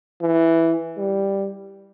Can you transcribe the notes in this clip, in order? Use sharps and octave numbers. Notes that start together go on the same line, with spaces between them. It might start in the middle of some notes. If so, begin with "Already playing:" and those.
E3
G3